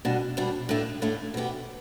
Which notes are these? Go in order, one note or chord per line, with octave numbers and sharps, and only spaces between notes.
B2 G3 D4
B2 G3 D4
A2 A3 D4
A2 A3 D4
B2 B3 G4